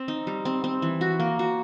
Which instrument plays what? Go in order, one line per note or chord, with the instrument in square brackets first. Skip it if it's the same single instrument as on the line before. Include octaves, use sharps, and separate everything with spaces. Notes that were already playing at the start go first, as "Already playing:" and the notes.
Already playing: [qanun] C4
D#4
G3
C4
C4
E3
F#4
A#3
F#4